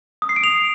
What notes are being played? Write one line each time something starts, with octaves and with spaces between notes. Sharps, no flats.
D#6
C7
D7
F7